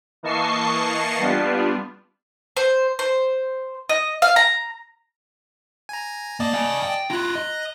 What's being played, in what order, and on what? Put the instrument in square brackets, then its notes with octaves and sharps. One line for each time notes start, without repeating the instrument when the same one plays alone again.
[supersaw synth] E3 A#3 D#5 A5 C#6 C7
G3 B3 D4 F4
[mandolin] C5
C5
D#5
F5
A#5
[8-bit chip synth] G#5 A#5
[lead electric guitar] A#3 [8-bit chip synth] D5 D#5 A5
[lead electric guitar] F5 G#5
G5
[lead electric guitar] E4 F4 [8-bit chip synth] A#5 F#6
[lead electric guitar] D#5